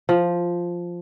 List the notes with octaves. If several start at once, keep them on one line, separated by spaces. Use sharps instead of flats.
F3